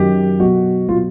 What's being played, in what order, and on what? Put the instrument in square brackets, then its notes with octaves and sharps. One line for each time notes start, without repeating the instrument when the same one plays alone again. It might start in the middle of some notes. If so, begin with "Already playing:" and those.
Already playing: [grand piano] F#2 D#3 F#3 G4
B2 F#3 F#4
B2 F#3 F4